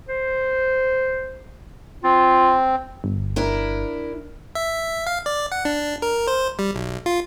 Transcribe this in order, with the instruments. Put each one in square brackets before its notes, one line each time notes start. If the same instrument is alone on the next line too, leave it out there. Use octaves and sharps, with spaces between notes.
[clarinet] C5
[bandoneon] C4 [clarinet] F4
[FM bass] G1
[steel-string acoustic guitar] D4 E4 A#4
[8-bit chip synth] E5
F5
D5
F#5
D4
A#4
C5
G3
B1
F4